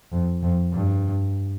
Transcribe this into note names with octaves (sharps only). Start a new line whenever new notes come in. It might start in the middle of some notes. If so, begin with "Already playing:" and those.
F2
F2
G2